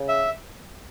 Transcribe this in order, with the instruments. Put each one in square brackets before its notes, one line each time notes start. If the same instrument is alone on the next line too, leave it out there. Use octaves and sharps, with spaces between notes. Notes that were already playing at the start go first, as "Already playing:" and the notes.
Already playing: [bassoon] C#3
[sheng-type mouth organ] E5